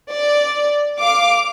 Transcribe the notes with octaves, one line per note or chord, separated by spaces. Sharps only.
D5
F5 D6